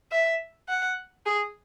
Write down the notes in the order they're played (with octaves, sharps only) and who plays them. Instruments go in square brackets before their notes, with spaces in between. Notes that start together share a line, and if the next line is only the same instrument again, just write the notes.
[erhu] E5
F#5
G#4